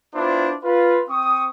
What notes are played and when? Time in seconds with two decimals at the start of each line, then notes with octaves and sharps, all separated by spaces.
0.15 B3 D4 E4 F4 C5
0.64 F4 B4
1.10 C4 C#6 D#6